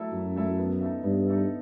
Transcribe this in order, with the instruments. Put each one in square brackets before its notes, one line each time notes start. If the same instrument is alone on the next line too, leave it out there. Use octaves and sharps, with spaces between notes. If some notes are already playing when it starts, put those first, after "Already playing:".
Already playing: [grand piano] F#3 A3 E4 A4 E5
[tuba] F#2 [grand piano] F#3
[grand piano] A3 E4 A4 E5
B3
D#4 A4 E5
[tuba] G2 [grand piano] B3
[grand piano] D#4 A4 E5